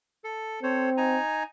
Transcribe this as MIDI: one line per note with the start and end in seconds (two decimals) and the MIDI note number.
0.24 0.60 69
0.63 1.18 60
0.63 0.90 69
0.63 0.90 72
0.63 0.90 73
0.97 1.43 63
0.97 1.43 80
0.97 1.43 82